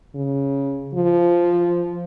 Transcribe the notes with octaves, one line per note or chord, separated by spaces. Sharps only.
C#3
F3